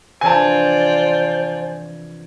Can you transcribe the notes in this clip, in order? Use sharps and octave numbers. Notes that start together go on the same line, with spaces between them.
F1 E3 D4 F4 C5 D5 G#5 A5